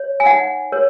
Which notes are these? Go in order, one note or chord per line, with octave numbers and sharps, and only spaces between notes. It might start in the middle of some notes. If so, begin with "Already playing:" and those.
Already playing: C#5
G#5
D#4 F#5
A#4 C#5